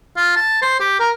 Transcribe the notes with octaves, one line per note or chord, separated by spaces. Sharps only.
F4
A5
C5
G4
A#4